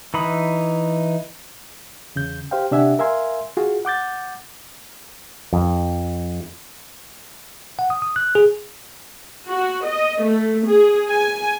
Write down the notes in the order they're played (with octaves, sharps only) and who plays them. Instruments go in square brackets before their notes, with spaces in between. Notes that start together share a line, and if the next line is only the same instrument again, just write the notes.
[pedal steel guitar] E3 D#4 B5 D#6
[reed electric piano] E2 C#3 G6
G4 C5 F5 G5
C3 D4 G4 E5 F#5 G#5
A#4 E5 F5 G#5 C6
F4 F#4 G#4
F#5 D6 G6 A6
[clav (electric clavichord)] F2
[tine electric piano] F#5
D#6
D#6
F#6
G#4
[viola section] F#4
D#5
A3
G#4
G#5